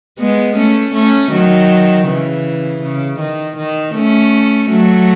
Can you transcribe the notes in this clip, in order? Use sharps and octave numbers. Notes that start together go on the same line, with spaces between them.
G#3 B3
A3 C#4
A3 C#4
D#3 F#3
C#3 E3
C#3
D#3
D#3
A3 C#4
F#3 A3